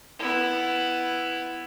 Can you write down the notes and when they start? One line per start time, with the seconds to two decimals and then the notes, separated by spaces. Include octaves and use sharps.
0.19 B3 E4